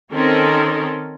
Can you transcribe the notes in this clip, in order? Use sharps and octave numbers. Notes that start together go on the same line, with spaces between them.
D#3 C4 C#4 A4 A#4